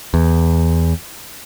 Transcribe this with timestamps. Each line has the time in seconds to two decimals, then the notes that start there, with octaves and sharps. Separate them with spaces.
0.14 E2